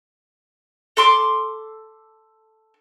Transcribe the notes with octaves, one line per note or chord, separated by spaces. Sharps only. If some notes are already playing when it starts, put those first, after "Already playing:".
A4 C6 D6